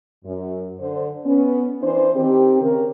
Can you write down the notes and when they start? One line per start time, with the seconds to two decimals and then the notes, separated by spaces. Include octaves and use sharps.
0.25 F#2
0.80 D3 C5
1.25 B3 C#4
1.82 E3 D4 C5
2.15 D#3 C4 G4
2.61 C#3 A#4